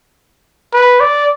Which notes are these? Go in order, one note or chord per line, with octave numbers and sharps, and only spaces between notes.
B4
D5